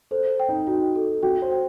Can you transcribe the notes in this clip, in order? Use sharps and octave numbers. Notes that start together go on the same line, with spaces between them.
A4 C5
G5
D#4
D#4 F#4
A4
F#4 G5
C5
G5